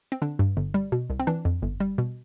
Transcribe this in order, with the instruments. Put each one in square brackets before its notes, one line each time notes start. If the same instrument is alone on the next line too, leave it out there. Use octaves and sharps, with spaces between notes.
[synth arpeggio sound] C4
D3 D4
G2
G1
G3
B2
C2
C4
E3 D4
F2
G1
G3
B2